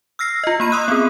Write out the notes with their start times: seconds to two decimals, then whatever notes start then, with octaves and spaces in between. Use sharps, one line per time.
0.19 E6 F6 A#6 C7
0.44 F4 D#5
0.60 A#3 B5 D#7
0.72 C6 D#6 E6 F#6
0.88 B3 C4 G#4